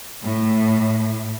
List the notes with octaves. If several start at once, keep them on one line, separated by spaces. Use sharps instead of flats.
A2